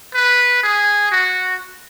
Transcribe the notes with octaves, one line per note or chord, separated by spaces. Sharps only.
B4
G#4
F#4